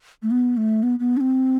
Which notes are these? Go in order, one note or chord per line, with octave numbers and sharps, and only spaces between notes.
A3
B3
A3
B3
B3
D4
C4